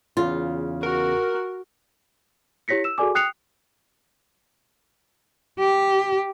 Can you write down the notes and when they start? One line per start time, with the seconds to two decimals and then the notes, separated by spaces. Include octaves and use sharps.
0.17 E2 C#3 F4
0.83 F#4 A#4
2.68 E4 G4 C#5 A#6 B6 C#7
2.84 E6 E7
2.98 F#4 G#4 A4 D5 G#5 D6
3.15 G5 D#6 F#6 C7 C#7 F7
5.59 G4